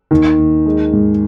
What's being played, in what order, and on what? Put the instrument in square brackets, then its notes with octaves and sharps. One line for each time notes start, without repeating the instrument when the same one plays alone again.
[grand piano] D#2 [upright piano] D#3
[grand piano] D#2
G#3
G#2